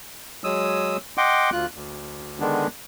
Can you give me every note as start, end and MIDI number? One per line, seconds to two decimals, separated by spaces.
0.44 0.97 54
0.44 0.97 56
0.44 0.97 87
0.44 0.97 88
1.18 1.50 75
1.18 1.50 78
1.18 1.50 79
1.18 1.50 84
1.18 1.50 86
1.52 1.66 38
1.52 1.66 65
1.52 1.66 90
1.75 2.40 38
2.40 2.67 50
2.40 2.67 51
2.40 2.67 56
2.40 2.67 59
2.40 2.67 62